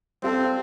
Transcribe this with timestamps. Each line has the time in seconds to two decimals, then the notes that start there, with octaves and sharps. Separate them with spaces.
0.23 G3 C4 F4 A4